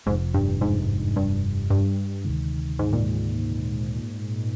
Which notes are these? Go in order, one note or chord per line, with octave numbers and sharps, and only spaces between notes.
F1 F2 G#2 C3 F3
G2
G#2
G2
G2
D2 C3 D#3 G#3
G#2
A#2